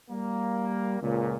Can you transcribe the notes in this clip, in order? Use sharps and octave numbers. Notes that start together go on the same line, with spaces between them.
G3 A#3
C#2 A#2